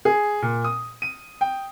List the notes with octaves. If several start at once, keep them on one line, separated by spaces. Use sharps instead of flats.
G#4
A#2
D#6
D#7
G5